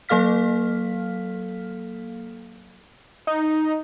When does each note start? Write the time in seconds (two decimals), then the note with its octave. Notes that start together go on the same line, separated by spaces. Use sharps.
0.09 F#3 A#3 A4 F5 F6 B6
3.27 D#4